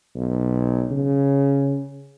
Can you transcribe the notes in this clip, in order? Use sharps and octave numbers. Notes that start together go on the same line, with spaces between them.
B1
C#3